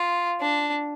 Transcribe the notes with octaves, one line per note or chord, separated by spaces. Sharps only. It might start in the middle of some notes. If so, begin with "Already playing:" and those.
Already playing: F4
D4